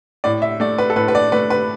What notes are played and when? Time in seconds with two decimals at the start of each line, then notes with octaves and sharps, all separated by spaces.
0.24 A2 D5
0.42 E5
0.60 A3 D5
0.78 B4
0.90 A4
0.96 A2 B4
1.08 B4
1.15 D5
1.32 A3 B4
1.50 B4